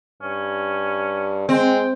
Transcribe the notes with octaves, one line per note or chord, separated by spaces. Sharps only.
G2 C#4
G#3 C4 G5